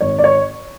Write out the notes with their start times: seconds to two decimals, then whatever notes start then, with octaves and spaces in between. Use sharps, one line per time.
0.01 G#1 C#5
0.18 D5
0.24 C#5